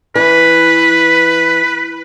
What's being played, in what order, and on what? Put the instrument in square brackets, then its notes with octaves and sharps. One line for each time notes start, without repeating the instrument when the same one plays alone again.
[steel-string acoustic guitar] E3 [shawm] B4